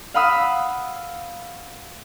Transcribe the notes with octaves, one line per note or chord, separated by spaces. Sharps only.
F5 F#5 B5 D#6 E6